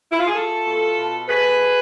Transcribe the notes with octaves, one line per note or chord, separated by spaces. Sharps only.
E4
F4
G#4
A3 F4 A4
B2
B2
A3 G#4 B4
A3